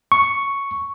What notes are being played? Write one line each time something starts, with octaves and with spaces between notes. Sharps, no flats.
C#6